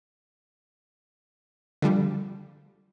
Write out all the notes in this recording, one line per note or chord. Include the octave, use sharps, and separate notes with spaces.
D3 F3 G3